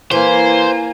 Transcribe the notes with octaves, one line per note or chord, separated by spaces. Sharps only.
E3 A#3 C5 G#5